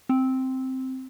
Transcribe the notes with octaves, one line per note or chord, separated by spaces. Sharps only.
C4